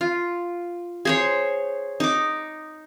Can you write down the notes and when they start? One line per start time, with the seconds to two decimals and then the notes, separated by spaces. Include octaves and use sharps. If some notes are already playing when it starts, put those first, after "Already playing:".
0.01 F4
1.05 G#4 C5 C#5
2.00 D#4 D6